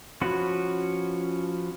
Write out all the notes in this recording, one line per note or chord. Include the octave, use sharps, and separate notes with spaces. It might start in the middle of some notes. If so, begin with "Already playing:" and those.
F3 C#4 F#4 B4